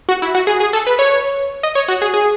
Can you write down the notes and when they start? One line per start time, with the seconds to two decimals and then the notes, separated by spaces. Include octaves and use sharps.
0.09 F#4
0.22 E4
0.35 F#4
0.47 G#4
0.60 G#4
0.73 A4
0.87 B4
0.99 C#5
1.63 D#5
1.75 C#5
1.88 F#4
2.02 G#4
2.14 G#4